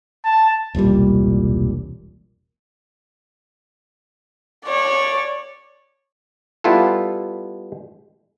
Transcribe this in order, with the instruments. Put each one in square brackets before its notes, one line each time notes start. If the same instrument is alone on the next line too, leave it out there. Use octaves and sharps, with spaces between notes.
[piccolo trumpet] A5
[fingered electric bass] E1 C2 A#2 G3
[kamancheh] C#5 D5
[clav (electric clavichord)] G3 B3 E4 F4 A4